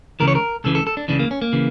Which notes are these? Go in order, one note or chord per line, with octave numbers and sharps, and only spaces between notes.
C#2 C#3 E3 A#4
C#5
A#4
C#2 C#3 E3 A4
A4
A4
D4
C#2 C#3 E3 D4
A#3
C#4
A#3
C#3 E3